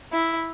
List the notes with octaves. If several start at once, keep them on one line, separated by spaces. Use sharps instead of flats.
E4